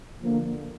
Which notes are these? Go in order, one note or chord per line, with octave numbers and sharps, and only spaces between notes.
D3 F3 A#3